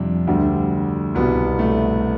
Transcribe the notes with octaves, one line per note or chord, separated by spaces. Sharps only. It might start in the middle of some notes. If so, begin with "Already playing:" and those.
Already playing: F2 C3 G3 D4
D2 D3 G3
C2 B2 G3 B3
A3